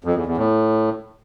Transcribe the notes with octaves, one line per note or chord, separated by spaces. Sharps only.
F2
E2
E2
A2